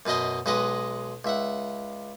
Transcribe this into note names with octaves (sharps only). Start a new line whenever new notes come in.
F#2 B2 B4 D#5 C6
B1 G#3 B4 D#5 F#5
C#2 E5 F#5